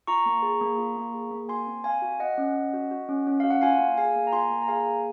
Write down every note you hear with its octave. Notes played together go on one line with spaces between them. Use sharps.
F4 A#5 C#6
A#3
G#4
A#3
F4
A#3
G#4
A#3
F#4 G#5 C6
C4
C4 F5 G#5
F#4
F#4 D#5 F#5
C#4
C#4
F#4
F#4
C#4
C#4
F#4 F5
F#5
F4 F5 G#5
A#3
G#4 F5 G#5
A#3
A#5
F4 G#5 C6
A#3
A#5
G#4 F5 G#5
A#3